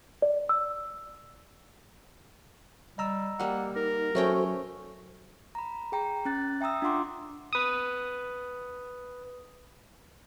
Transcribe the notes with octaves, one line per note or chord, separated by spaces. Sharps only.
D5
E6
G3 D#5 A#5 E6
G3 A#3 F#5
D#4 A#4
F#3 A3 C#4 F#4 A4 C5 G5 G#5
A#5 B5
G#4 G5 A#5
C#4 F#6 A6
E5 G5 A#5 D#6 E6
D4 F4 F#5 C6 D6
B4 D#6